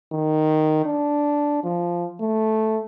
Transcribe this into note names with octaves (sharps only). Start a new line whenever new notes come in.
D#3
D4
F3
A3